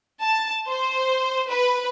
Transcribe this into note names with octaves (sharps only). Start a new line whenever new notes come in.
A5
C5
B4